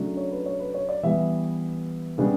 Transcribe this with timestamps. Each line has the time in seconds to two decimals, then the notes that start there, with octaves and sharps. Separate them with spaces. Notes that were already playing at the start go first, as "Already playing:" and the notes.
Already playing: C#3 F#3 A3 D4
0.17 C#5
0.31 B4
0.46 C#5
0.60 B4
0.74 C#5
0.89 D5
1.03 E3 G3 B3 E5
2.18 C#3 G3 B3 D4